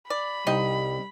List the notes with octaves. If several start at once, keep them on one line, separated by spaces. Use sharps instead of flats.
D5 B5
C2 G3 C4 D#4 D#5